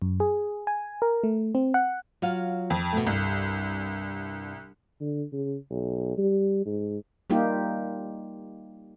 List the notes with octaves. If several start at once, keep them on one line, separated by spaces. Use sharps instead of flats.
F#2
G#4
G#5
A#4
A3
C4
F#5
F#3 F4 F5
F2
B2 A3
C2 G2
D3
C#3
B1
G3
G#2
G3 A#3 D#4 F4 G4